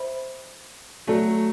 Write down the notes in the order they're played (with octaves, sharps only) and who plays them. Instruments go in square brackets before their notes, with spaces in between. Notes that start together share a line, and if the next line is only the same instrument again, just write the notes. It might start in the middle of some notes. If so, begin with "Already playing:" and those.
Already playing: [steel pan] C5 E5 B5
[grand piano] F#3 A3 [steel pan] F#4 A4 D5 A5